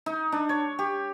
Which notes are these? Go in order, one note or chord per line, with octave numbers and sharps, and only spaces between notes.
D#4
D4
C#5
G4